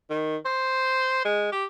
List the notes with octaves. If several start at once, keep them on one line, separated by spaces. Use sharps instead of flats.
D#3
C5
G#3
G4